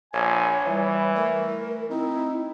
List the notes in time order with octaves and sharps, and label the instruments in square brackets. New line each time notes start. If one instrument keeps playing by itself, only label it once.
[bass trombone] A#1 [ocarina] C#5 [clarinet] G#5
[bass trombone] E3 [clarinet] G3
[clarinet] A3 [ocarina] A#4
[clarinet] C4 [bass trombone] D#4 [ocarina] E4